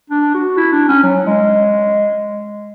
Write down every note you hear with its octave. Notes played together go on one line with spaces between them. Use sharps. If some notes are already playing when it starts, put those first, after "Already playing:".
D4
F#4
E4
D4
C#4
F#3
G#3